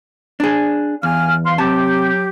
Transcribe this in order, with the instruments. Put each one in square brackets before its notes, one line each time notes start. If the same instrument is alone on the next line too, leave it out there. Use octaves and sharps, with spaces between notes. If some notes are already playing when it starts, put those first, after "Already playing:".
[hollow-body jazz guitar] D4 G#4
[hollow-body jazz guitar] E2 [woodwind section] F5 G#5 F6
[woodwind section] F5 C6
[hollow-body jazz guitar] C3 A5 [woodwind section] F#3 G4